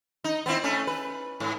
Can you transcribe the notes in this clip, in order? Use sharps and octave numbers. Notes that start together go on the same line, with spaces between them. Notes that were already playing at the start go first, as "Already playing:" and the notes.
D#4
B3 C4 E4
A3 C#4
B4
G#2